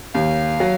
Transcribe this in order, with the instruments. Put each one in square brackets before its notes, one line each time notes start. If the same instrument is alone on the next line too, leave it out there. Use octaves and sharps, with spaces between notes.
[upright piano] D#2 [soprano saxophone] F5
[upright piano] F#3